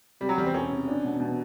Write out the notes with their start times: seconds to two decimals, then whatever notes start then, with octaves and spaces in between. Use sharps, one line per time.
0.20 C3 G3
0.29 F#3
0.38 E2 G3
0.46 C4
0.54 E1 C#4
0.71 C3
0.88 D4
1.04 B2
1.20 B2